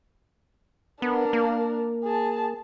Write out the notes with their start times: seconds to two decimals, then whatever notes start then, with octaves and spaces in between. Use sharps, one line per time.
1.02 B3 D4 A#4
1.33 A#3
2.04 G#4 A5